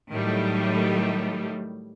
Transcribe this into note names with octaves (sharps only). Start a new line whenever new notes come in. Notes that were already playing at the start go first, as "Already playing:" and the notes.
A2 D#3 F#3 G3 A3